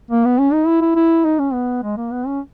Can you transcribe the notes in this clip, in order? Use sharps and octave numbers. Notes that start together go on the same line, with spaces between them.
A#3
B3
C#4
D#4
E4
E4
E4
D#4
C#4
B3
G#3
A#3
B3
C#4